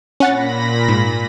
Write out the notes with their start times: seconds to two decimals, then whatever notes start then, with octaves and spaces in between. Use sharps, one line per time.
0.20 A#2 C#4 F#5 B5 A6 A#6
0.89 G#2